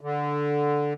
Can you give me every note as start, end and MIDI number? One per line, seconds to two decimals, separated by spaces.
0.01 0.93 50